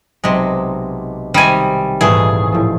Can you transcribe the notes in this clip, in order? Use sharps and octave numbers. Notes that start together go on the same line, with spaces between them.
B1 C3 G#3
C3 D#3 G3 G#5
D#1 G#2 E3 A3 G#4 F5
A2 F3